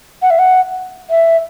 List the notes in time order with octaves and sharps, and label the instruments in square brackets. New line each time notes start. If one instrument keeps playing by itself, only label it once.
[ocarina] F#5
E5
F#5
E5